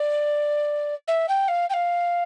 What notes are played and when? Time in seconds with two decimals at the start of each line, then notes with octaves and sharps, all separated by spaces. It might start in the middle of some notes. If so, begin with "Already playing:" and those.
Already playing: D5
1.07 E5
1.28 G5
1.48 F5
1.69 G5
1.73 F5